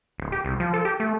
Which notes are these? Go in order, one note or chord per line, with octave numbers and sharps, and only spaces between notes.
D1
G4
C2
F3
A4
G4
A3